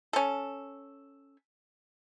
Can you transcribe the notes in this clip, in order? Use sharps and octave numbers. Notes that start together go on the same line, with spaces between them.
C#4 A4